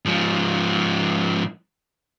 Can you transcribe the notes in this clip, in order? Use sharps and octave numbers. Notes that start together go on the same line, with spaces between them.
G#2 F3